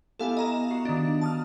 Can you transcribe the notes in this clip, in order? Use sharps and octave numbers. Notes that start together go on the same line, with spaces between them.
B3 E4 G4 A4 F5 G#5
D#5 A#5 E7
F#4 F5
D#3 D4
A5 D#6 F6